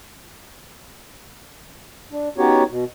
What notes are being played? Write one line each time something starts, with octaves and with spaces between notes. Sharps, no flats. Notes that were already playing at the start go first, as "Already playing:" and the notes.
D4
B3 C#4 D#4 F#4 G4 C#5
B2